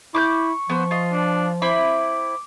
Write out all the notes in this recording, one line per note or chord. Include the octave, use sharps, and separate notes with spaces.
E4 C#6 D6 F#6 G6
F3 B3 C5
F4 D#5
D4
C4 E4 B5 D6